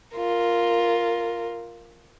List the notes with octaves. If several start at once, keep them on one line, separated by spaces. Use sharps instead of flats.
F4 A#4